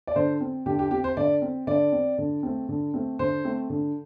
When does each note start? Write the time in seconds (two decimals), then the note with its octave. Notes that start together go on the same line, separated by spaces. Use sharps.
0.07 D5
0.16 D3 C5
0.41 C4
0.66 D3 G4
0.79 G4
0.91 C4 G4
1.04 C5
1.17 D3 D5
1.42 C4
1.67 D3 D5
1.92 C4
2.18 D3
2.43 A3 C4
2.69 D3
2.94 A3 C4
3.19 D3 C5
3.45 A3 C4
3.70 D3